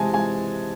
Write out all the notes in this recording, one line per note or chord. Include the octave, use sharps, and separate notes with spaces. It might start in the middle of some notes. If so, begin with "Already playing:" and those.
Already playing: C3 E3 G#3 G#5 A5
G#3 G#5